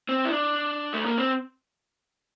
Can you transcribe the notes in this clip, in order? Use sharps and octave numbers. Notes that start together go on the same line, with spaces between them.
C4
E4
D4
A3
A#3
C4